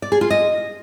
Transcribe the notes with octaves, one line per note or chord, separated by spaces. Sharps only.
D5
G#4
F4
D#5